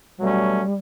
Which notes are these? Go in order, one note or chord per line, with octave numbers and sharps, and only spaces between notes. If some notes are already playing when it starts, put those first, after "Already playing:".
B2 F#3 G3 A3 C#4